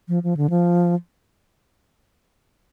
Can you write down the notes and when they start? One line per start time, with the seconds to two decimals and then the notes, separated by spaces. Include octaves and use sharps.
0.08 F3
0.24 F3
0.37 D3
0.50 F3